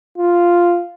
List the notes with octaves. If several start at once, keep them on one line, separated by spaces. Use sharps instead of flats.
F4